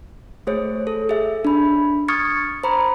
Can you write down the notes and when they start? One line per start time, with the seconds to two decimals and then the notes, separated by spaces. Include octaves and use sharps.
0.47 A3 G#4 C5 C#5
0.87 A4
1.09 G#4 E5
1.45 D4 B5
2.08 C#6 D#6 F6 G#6 A6 C#7
2.64 C5 A#5 B5